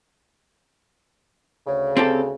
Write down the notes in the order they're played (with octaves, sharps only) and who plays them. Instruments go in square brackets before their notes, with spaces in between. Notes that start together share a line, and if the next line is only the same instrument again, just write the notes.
[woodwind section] D2 C#3
[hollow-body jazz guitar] C4 G4 A4